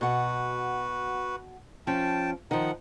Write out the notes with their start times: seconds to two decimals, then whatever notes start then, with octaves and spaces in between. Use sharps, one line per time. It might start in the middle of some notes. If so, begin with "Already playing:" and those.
0.01 B2 F#4 B4 F#5
1.87 F3 C#4 G5 A5
2.51 D#3 F3 D#4 F#5